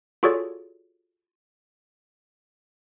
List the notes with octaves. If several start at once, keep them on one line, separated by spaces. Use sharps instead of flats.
F4 F#4 G#4 A4 C#5 D5